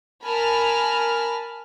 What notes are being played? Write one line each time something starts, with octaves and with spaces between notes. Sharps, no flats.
A#4 G#5 A5 B5 F6